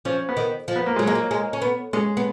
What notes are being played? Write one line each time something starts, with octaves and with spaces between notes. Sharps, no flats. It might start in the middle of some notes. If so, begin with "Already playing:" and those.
F3 C#4
B3
D#3
F3
B3
A#3
F#3 G#3
G#3 A#3
F#3
G#3
C#4
B3
G#3 C#4
B3